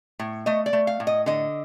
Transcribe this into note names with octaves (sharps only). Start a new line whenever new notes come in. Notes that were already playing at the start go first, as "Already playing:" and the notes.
A2
A3 D#5
D5
A3
F5
A2
D#5
D3 D#5